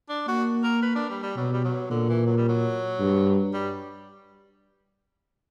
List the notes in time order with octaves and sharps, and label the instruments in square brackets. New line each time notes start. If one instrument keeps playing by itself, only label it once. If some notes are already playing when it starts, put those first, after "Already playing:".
[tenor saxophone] D4
[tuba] A#3 [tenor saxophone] F#4
[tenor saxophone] A#4
B4
D4
G3
G3
[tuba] B2 [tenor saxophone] F#3
[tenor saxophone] G3
F#3
[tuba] A#2 [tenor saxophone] D3
[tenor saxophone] E3
F#3
G3
F#3
[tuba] G2
[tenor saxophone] G3